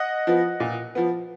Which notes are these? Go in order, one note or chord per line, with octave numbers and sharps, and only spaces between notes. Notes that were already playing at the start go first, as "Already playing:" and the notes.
Already playing: D#5 F#5
F3 B3
A#2
F3 B3